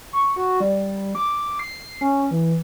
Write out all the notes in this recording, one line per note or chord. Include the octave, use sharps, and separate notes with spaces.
C#6
F#4
G3
D6
C7
C#4
E3